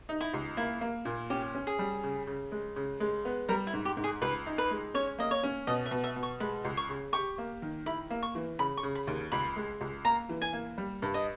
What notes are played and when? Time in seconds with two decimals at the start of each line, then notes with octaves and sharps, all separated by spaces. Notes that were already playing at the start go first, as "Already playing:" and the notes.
0.09 D#4
0.21 E4
0.34 C#2
0.57 A#3 E4
0.81 A#3
1.05 A#2
1.30 C#4 G4
1.55 C#4
1.67 G#4
1.79 G3
2.04 C#3
2.27 C#3
2.52 G#3
2.76 C#3
3.00 G#3
3.25 B3
3.49 G3 A#4
3.67 E4
3.73 G#2
3.85 G4
3.97 G#2
4.04 G#4
4.22 C#2 B4
4.46 D#4
4.58 B4
4.71 G#3
4.94 C#4 C#5
5.19 A#3 D#5
5.31 C#5
5.43 C#4
5.67 B2 D#5
5.86 E5
5.91 B2
6.04 E5
6.16 B2
6.23 C#6
6.40 G#3 B5
6.65 C#2
6.77 C#6
6.89 C#3
7.13 G4 C#6
7.38 A#3
7.62 D#3
7.86 E4 B5
8.11 A#3
8.23 C#6
8.35 E3
8.59 C#3 B5
8.77 C#6
8.83 C#3
8.95 B5
9.07 D#2
9.32 C#2 B5
9.56 G#3
9.81 C#2
10.05 A#3 A#5
10.29 E3
10.42 G#5
10.53 A#3
10.78 G3
11.02 G2
11.14 D#5